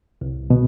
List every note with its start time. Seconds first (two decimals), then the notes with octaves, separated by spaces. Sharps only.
0.21 C2
0.50 B2